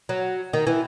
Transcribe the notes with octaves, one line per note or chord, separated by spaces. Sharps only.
F#3
D#3
E3